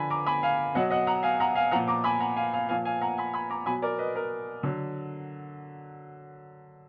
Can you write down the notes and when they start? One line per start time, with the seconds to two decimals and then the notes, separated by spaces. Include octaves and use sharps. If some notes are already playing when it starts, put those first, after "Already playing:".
Already playing: D3 F3 G#5 B5
0.10 A#5 D6
0.26 G#5 B5
0.43 F5 G#5
0.74 B2 F#3 D#5 F#5
0.90 D#5 F#5
1.07 F#5 A#5
1.23 F5 G#5
1.40 F#5 A#5
1.55 F5 G#5
1.71 F3 F#5 A#5
1.75 A#2
1.88 A#5 D6
2.04 G#5 B5
2.20 F#5 A#5
2.36 F5 G#5
2.53 F5 G#5
2.69 A#2 F3 F5 G#5
2.85 F5 G#5
3.01 F#5 A#5
3.17 G#5 B5
3.34 G#5 B5
3.50 A#5 D6
3.66 B2 F#3 G#5 B5
3.82 A#4 D5
3.98 B4 D#5
4.16 A#4
4.63 D3 F#3